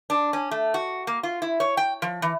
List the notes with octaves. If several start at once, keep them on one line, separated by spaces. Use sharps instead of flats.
D4
C#4
A3
F#4
A#3
F4
E4
C#5
G5
F3
E3